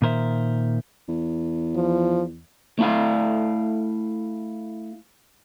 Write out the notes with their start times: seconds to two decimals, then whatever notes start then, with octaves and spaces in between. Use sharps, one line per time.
0.02 A#2 D#3 A#4 C5 E5
1.08 E2
1.75 F3
2.79 A3 E4 F5